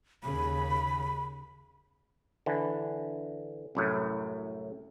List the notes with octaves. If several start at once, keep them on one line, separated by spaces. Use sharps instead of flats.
D#2 C#3 B5
D3 E3
C2 F#2 A2